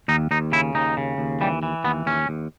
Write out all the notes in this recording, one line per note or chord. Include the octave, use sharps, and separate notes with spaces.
D#2 D#4
D#2 D#4
C#3 E4
D#2 D#4
C#3
D#2
E3 G3
E3
D#2 B3
D#2 C#4
D#2